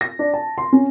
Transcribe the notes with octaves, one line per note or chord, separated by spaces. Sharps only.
A#6
D4
A5
C6
C#4